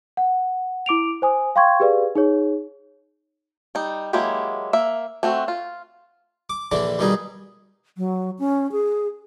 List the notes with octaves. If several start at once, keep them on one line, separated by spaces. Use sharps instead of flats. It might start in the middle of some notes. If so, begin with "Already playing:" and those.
F#5
E4 D6 D7 F7
C5 G#5 D#6
F5 G5 C6 C#6 G#6
G4 G#4 B4 D5 F5
D#4 G#4 C#5
G3 D#4
F#3 G#3 A#3 E4 G4
A#3 E5
A3 C4 F#4
F4
D6
A#1 D3 E3 D4 D6
B2 D#3 G3 D#4 G#4
F#3
C#4
G#4